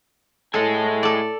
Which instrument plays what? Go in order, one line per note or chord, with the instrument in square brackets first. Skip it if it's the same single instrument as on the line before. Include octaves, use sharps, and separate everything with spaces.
[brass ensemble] A2 [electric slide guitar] G#4 D#5 G#5 [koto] A4
[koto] A4 D5